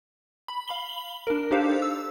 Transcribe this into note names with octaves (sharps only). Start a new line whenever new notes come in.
B5
F5 B5 F#7 G7
D4 A#4
D4 D#4 G4 A4 C5 F5
E6